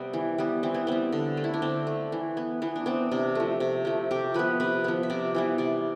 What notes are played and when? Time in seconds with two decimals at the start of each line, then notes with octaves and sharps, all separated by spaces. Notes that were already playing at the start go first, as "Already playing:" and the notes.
Already playing: C3 G3 B3
0.13 E3
0.38 G3 B3
0.63 E3 C4
0.74 B3
0.87 G3 B3 C4
1.12 D3
1.37 A3
1.44 E4
1.54 D4
1.62 D3 C4
1.87 A3
2.12 E3
2.37 B3
2.62 E3 B3
2.76 D4
2.86 B3 C4
3.11 C3 D4
3.35 F3 A3
3.60 C3
3.85 F3 A3
4.11 C3 G4
4.34 F3 B3 B4
4.60 C3 B4
4.84 F3 B3
5.03 E5
5.10 C3 D5
5.35 E3 G3 B3
5.58 C3 D5